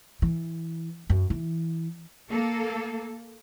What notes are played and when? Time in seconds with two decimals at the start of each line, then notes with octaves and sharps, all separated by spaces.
0.22 E3
1.10 F#2
1.30 E3
2.30 A#3 A4